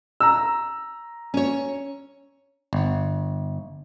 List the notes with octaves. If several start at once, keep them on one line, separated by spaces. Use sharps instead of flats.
A#5 E6
C#4 C#5
G1